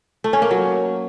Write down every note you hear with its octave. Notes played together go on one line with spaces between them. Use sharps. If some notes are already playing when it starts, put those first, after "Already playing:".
A3
C#4
A#3
F#3